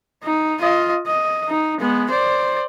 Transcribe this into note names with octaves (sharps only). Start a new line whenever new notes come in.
D#4
F4 D#5
D#5
D#4
G#3 B3
C5 D5